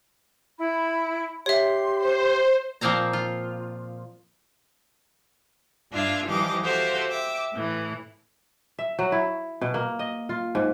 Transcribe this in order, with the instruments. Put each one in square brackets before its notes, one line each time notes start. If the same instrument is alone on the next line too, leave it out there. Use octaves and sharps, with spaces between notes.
[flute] E4 [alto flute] B5
[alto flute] G4 [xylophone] C#5 E5 [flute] C6
[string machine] C5
[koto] A#2 F3 A#3 C4 F5 A#5
F4
[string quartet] G2 D4 F4 E5 F5 G#6
E3 F3 G3 G4 D#5 D6
F#4 G4 A4 C5 E5 F5
E5 G5 D6
A2 E3
[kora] E5
F#3
E4
B2
A#3
D#5
F4
G#2